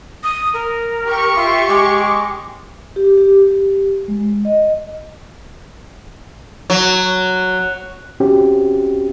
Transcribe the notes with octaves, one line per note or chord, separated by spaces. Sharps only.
D#6
A#4
G4 C#6
F4 E5
G#3 D6
G4
G4
G4
G#3
D#5
F#3
C4 C#4 F#4 G4